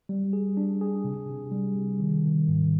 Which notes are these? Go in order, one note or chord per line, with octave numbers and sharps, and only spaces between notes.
G3
G#4
D4
G#4
C3
C3
G3
C3
D#3
D#3
G#2